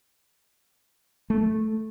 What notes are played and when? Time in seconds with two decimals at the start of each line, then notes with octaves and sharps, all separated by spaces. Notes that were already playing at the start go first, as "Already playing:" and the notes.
1.30 A3